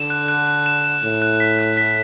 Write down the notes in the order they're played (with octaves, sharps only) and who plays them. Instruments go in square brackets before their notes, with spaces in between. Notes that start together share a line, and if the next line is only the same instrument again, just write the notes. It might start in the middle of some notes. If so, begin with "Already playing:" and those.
Already playing: [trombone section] D3 [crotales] E7
[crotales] F#6
F#6
F#6
E7
E7
[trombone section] A2 [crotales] E7
[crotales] F#6
B6
F#6
B6